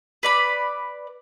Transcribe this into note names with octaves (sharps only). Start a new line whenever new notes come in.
B4 D5 B5